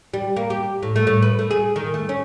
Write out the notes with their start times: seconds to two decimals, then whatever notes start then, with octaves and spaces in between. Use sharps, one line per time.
0.14 G3
0.36 A#3
0.50 G4
0.83 A2
0.96 A3
1.07 A2
1.22 B4
1.39 A3
1.51 G#4
1.76 D#3
1.94 A3
2.09 C#4